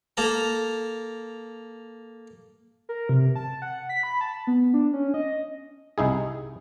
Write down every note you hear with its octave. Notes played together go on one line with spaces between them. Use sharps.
A#3 A4 A#5
A#4
C3
A5
F#5
B6
B5
A5
B3
D4
C#4
D#5
C2 D#4 E4 G#4